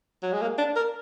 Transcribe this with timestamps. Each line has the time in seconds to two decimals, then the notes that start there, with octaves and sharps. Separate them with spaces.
0.23 F#3
0.32 G#3
0.41 A#3
0.58 D4
0.76 A#4